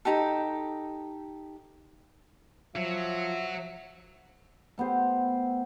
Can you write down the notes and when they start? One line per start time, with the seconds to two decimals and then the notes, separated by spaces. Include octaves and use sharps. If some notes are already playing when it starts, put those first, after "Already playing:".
0.05 D#4 G4 A4
2.76 F3 F#3 E5
4.78 A3 B3 G4 C5